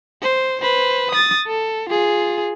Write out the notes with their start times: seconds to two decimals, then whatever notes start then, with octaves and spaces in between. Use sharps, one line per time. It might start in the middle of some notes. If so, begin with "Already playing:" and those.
0.22 C5
0.62 B4 C5
1.11 D#6 A6
1.47 A4
1.90 F4 G#4